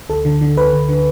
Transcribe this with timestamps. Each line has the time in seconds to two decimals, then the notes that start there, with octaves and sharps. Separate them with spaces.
0.09 D2 A4
0.25 D3
0.41 D3
0.57 D2 B4
0.73 D2
0.89 D3